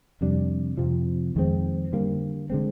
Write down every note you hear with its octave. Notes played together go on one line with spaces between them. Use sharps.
F2 C3 G3 D4
F2 C3 F3
F2 D#3 G#3 C4
D3 G3 A#3
D3 G#3 C4